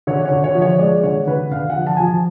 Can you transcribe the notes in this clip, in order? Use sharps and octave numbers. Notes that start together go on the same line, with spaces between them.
D3 C#5
C#5
D3
C#5
F3
C#5
G#3 D5
D3 C#5
D3 B4
D3 F5
F#5
F3
A5
G#5
F3 A5